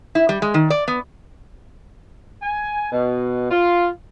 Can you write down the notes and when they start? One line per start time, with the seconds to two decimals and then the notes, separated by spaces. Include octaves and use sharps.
0.15 E4
0.29 G3
0.42 G#3
0.54 D#3
0.70 D5
0.88 B3
2.42 G#5
2.92 B2
3.51 F4